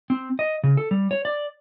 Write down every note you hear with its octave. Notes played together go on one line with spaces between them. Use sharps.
C4
D#5
C#3
A4
G3
C#5
D5